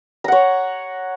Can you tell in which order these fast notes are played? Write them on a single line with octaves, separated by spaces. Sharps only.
A#5 F#5 C#5